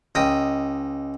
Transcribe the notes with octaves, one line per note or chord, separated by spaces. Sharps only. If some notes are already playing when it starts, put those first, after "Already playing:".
C#2 D#5 G5